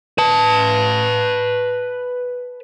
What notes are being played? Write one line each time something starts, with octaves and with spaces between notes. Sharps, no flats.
B4 A5